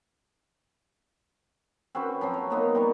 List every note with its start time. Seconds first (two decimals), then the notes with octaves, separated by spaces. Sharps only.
1.95 C4 C#4 F#4 B4
2.21 F3 F#3 C4
2.34 C#5
2.50 A#3 B3 D#4
2.75 G3 D#4 C#5